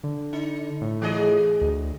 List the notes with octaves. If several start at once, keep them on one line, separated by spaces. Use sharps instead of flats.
D3
D#4
A2
E3 G#4 D#5
D2